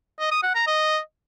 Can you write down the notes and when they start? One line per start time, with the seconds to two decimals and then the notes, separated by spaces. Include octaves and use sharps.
0.20 D#5
0.31 D#6
0.43 F#5
0.55 A#5
0.67 D#5